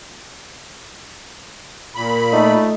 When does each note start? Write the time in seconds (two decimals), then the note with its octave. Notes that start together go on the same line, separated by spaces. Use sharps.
1.95 A#2 B5
2.32 A3 D#4